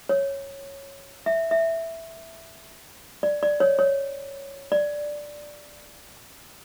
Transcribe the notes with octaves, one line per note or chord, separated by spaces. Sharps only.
C#5
E5
E5
D5
D5
C#5
C#5
D5